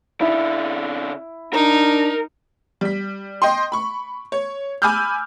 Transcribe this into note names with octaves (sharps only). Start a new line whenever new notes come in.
C#3 D4 E4
D4 D#4 A#4
G3 B6
D#5 G5 C6
B5 C#6
C#5
G#5 B5 D6 E6 F6 G6